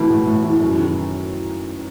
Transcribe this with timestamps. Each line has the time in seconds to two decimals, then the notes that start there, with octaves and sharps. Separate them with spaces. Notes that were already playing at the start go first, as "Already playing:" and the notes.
Already playing: B2 E3 A3
0.08 A2
0.26 A2
0.43 E3
0.60 F#2
0.78 D#3